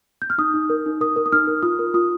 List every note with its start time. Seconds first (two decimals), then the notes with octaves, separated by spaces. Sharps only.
0.22 G6
0.30 F6
0.38 D#4 D#6
0.54 D#4
0.70 A#4
0.86 D#4
1.01 A#4 D#6
1.16 A#4
1.26 D#6
1.32 D#4 F6
1.48 A#4
1.63 F4 D#6
1.79 A#4
1.94 F4 D#6